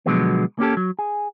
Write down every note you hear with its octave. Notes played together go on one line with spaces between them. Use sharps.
B2 D3 F3 F#3 G#3 B3
A#3 C#4 G4 A4
F#3
G#4